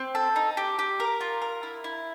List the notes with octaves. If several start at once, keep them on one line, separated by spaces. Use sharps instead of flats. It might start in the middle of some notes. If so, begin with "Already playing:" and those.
Already playing: C4
A4
D#4
G4
G4
A#4
F4
A#4
E4
E4